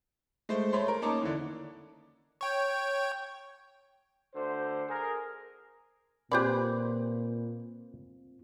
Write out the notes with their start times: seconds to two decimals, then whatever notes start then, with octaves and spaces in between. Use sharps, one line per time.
0.49 G#3 A3 C5
0.73 A3 C#5 B5 C6
0.88 A#4
1.02 A#3 C#4 D#4 A5 D6
1.22 D3 E3
2.41 C#5 G5
4.34 D2 D3 C5
4.88 G#4 A#4
6.32 A#2 C4 F4 G4 G#4 B4 C5 D5